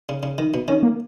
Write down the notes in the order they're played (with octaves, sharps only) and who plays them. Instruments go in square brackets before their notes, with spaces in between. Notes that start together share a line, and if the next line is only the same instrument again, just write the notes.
[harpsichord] C#3
C#3
D#3
B2
[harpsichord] D#3 [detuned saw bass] C#4
[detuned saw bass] A#3